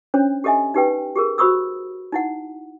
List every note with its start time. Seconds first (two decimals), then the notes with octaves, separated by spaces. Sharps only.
0.14 C#4 D4 C5 C#5
0.44 G4 A4 D#5 E5 G#5
0.74 D#4 G4 B4 G5
1.16 G4 G#4 A#4
1.38 F#4 C5 B5 C#6 D#6 E6
2.12 D#4 E4 F#5